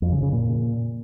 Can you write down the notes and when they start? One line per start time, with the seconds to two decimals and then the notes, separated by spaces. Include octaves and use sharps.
0.02 F2
0.12 C#3
0.22 C#3
0.33 A#2